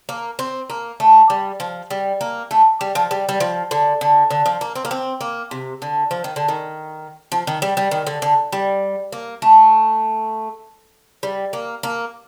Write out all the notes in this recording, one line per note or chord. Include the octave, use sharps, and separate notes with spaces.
A#3
C4
A#3
A3
G3
F3
G3
A#3
A3
G3
F3
G3
G3
F3
D3
D3
D3
F3
A#3
C4
A#3
C4
A#3
C3
D3
F3
D#3
D3
D#3
F3
D#3
G3
G3
D#3
D3
D3
G3
A#3
A3
G3
A#3
A#3